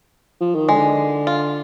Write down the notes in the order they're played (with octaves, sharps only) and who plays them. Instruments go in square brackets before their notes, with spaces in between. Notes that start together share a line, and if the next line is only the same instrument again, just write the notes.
[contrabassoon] F3
D#3
[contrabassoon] D3 [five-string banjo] G#3
[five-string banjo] F4